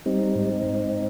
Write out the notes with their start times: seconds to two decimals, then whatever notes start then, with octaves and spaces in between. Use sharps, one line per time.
0.06 G3 C4 D#4
0.35 G#2
0.66 G#2